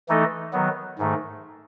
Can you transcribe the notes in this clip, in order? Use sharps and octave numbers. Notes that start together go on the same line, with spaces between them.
E3 A3 D#4 A4 D#5
D#3 F#3 B3
G#2 D#3 A3